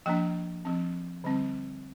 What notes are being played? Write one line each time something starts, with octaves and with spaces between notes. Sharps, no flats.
F3 A#3 D4 G5
F3 C4
D3 G3 C4